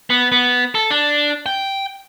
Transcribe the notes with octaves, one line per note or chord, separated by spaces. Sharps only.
B3
B3
A4
D4
G5